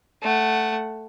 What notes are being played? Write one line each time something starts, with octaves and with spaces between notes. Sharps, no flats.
A3 F#5